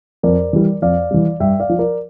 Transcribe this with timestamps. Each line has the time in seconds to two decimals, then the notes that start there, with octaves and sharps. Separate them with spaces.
0.23 F2 A#4 D5
0.53 E3 G3
0.82 F2 D5 F5
1.11 E3 G3
1.40 G2 E5 G5
1.60 D5 F5
1.69 F3
1.79 A#4 D5